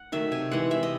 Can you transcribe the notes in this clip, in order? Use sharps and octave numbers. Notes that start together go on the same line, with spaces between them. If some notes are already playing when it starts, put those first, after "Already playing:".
Already playing: F#5
D#3 F#3 A3 E5
C3 G#5
E3 G#3 F#5
C3 E5
D#5